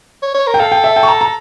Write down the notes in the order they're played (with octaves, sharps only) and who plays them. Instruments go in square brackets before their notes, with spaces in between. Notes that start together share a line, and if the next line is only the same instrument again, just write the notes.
[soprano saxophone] C#5
C#5
A#4
[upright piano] G5
[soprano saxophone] A4 [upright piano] F5
[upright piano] G5
E5
G5
C#6
A#5
A#5